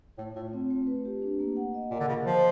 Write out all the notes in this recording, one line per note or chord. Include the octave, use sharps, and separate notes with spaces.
A2 A3
A2 F4
C4
A3
B4
G4
D4
A#3
F#5
D#5
A#2 A#4
D3
C#3 F4
F3 D#5